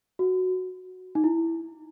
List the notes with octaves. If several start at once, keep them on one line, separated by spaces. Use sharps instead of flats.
F#4
D#4
E4